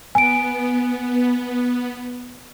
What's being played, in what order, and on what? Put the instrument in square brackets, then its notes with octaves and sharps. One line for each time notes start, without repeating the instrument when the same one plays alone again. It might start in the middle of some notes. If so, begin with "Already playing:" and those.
[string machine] B3 [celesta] G#5 D7